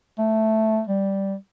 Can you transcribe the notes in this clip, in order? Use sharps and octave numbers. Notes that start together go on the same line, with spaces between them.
A3
G3